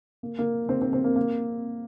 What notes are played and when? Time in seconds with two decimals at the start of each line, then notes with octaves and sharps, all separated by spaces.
0.23 A#3
0.39 A#3
0.69 C4
0.82 C4
0.93 C4
1.04 A#3
1.16 A#3